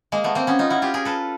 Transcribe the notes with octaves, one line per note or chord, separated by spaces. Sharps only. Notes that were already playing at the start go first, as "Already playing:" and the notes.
G#3 A#3
A3 B3
A#3 C4
B3 C#4
D#4 F4
E4 F#4
F4 G4
G#4 A#4
A4 B4